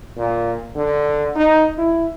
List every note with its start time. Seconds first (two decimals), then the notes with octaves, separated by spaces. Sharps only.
0.17 A#2
0.75 D3
1.36 D#4
1.78 E4